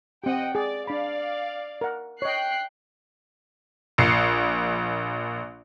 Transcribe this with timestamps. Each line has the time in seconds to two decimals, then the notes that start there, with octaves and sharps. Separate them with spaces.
0.24 C4 G4 D#5 F#5 G5
0.55 G#4 D5
0.87 D4 D5 F5 B5
1.81 A#4 F#5
2.22 C#5 D#5 G5 F#6 C7
3.98 A#1 C7 C#7